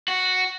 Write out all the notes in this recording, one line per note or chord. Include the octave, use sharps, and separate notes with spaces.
F#4